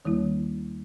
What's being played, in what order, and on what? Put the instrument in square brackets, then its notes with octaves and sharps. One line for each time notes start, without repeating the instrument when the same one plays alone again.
[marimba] D#2 D#3 G3 A#3 E4